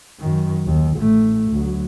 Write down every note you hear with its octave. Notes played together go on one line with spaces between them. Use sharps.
F#2 D#3
D#2
A1 A3
D2 F#3